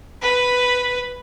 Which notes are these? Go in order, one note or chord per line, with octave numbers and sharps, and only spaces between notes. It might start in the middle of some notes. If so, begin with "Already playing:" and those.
B4